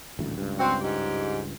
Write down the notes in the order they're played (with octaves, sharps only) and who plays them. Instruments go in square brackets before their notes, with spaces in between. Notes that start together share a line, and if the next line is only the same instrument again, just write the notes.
[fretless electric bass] D#1 A1 D2
C#2 G2
[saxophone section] C4 F#4
G#2 G4